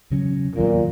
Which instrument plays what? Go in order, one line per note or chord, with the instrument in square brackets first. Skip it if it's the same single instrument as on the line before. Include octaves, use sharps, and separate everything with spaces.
[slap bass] E2 C#3 F#3 C#4
[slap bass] E2 D#3 F#3 A#3 [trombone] A#2